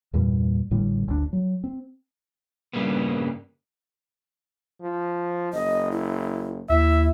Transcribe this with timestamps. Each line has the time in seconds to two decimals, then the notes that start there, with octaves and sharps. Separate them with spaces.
0.13 E2 G2 A#2 G3
0.71 A1 A2 D3 G3
1.07 G1 D2 C#3 D4
1.33 F#3
1.64 C4
2.73 G2 C#3 G3 A#3 B3
4.81 F3
5.53 F#1 D#5
5.92 E4
6.69 D#2 E4 E5